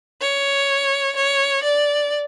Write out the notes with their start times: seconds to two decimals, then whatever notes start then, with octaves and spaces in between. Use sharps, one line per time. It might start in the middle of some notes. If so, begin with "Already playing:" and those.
0.21 C#5
1.16 C#5
1.63 D5